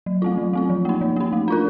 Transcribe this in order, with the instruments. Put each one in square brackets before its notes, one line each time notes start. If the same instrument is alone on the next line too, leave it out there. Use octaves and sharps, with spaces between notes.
[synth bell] F#3
A3 C4 F4
F#3
A3 C4 F4
F3
A#3 D#4
F3
A#3 D#4
A3
D4 F4 A#4